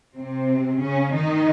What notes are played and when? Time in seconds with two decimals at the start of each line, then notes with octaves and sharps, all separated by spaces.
0.15 C3 C4
0.81 C#3 C#4
1.15 D#3 D#4